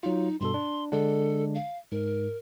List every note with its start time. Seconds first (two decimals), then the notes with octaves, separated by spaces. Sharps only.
0.03 F#3 D#4 F4
0.41 G2 B2 A4 C6
0.54 D4
0.92 D3 G#3 D4 A4
1.55 F5
1.92 G#2 A#4